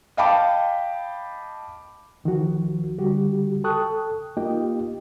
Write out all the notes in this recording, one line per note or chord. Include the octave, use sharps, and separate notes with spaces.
D#5 F5 G5 A5 B5 D6
C2 D#3 F3 F#4
D3 G3 F#4 G4
A4 G5 A5 C#6 D#6 F#6
A#3 D#4 F4 G4 D#5 G5